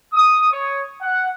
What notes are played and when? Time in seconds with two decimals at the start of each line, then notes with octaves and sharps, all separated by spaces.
0.13 D#6
0.52 C#5
1.01 F#5